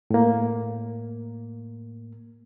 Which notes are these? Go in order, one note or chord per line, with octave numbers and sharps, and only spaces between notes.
A2 A#3